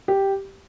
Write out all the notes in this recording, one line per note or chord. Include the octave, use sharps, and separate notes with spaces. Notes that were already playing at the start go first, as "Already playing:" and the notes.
G4